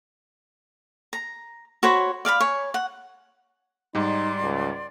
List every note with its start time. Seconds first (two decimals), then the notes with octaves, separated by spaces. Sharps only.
1.13 A#5
1.83 F#4 C5 C#5 B5
2.25 D5 F5 A5 B5
2.40 C#5 G#5
2.74 F#5
3.95 G#2 G3 D#4 D5 C6
4.41 C#2